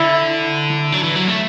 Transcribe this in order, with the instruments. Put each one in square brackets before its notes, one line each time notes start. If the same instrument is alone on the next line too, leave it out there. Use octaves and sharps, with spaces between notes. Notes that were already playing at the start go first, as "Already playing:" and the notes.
Already playing: [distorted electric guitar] D3 [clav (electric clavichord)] E4
[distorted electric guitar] F#3
E3
F#3
A3